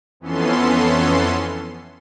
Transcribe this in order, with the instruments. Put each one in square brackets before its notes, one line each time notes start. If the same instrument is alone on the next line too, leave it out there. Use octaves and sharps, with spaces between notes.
[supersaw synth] F2 E3 B3 C#4 A4 C6